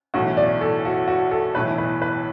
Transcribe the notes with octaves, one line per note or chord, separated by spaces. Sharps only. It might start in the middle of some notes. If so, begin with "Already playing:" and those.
B1 A2 E3 F#4
D5
A4
F#4
F#4
A4
B1 A2 E3 B4
B4
B4